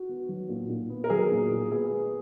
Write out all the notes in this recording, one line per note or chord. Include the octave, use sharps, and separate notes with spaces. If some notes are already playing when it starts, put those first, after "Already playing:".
Already playing: F#4
B3
F#3
A#2
A#2
B3
A#4
F#3 G#4
A#2
A#2
B3 G#4
G#3